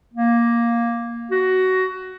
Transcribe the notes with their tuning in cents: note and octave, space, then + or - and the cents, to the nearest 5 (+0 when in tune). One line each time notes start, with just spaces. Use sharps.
A#3 +10
F#4 +15